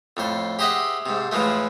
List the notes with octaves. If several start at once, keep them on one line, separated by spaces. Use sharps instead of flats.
F2 A2 C5
G4 G#4 C5 D#5 E5 F#5
G#2 C3
A2 E3 F3 G#3 A3